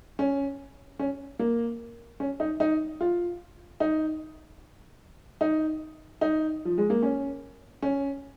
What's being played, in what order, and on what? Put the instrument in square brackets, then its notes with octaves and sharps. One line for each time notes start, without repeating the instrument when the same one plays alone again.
[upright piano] C#4
C#4
A#3
C#4
D#4
D#4
F4
D#4
D#4
D#4
F3
G#3
A#3
C#4
C#4